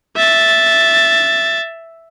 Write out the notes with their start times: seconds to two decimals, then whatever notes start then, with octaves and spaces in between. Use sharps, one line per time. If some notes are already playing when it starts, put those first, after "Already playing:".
0.17 E5 A6